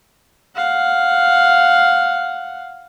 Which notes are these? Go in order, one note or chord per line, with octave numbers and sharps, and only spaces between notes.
F5 F#5